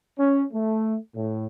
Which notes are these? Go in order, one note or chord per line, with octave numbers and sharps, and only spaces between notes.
C#4
A3
A2